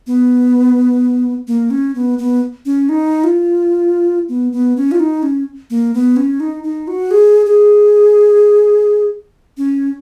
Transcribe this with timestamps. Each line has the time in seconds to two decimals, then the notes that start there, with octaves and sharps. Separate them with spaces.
0.07 B3
1.48 A#3
1.70 C#4
1.95 B3
2.19 B3
2.66 C#4
2.89 D#4
3.24 F4
4.29 B3
4.52 B3
4.77 C#4
4.92 F4
5.00 D#4
5.23 C#4
5.70 A#3
5.94 B3
6.17 C#4
6.40 D#4
6.64 D#4
6.88 F#4
7.11 G#4
7.46 G#4
9.57 C#4